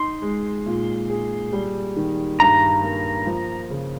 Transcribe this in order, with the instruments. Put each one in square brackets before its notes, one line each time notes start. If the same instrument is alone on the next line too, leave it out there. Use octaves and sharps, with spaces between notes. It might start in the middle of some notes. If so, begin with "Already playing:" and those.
Already playing: [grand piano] D#4 [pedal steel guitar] C6
[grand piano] G#3
A#2
G#4
G3
D#3
[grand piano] G2 [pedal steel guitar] A#5
[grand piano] A#3
F3
C#3